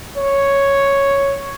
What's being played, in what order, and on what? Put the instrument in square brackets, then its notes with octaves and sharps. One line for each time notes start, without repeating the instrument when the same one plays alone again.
[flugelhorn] C#5